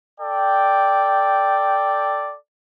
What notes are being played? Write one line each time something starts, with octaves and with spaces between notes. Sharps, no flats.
A4 D5 G5